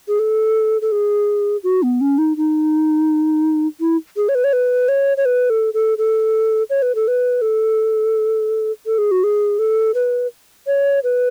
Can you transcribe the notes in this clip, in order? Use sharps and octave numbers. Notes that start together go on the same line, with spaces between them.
G#4
A4
A4
G#4
F#4
B3
C#4
D#4
D#4
E4
G#4
C#5
B4
C#5
B4
C#5
C#5
B4
A4
A4
A4
C#5
B4
A4
B4
A4
A4
G#4
F#4
G#4
A4
B4
C#5
B4